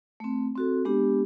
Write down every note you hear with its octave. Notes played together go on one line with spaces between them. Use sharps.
A3 C4
C4 F#4 A4
G#3 B3 D4 G4